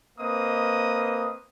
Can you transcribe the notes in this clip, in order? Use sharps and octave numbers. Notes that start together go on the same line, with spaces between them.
A#3 C4 B4 D#5 D#6